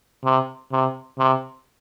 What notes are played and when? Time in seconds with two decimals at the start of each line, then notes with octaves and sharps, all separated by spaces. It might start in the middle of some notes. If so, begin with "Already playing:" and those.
0.24 C3
0.72 C3
1.18 C3